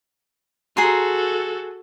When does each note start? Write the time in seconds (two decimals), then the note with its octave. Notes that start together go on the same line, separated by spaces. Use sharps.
0.77 F#4 G#4 A4 A#5 C6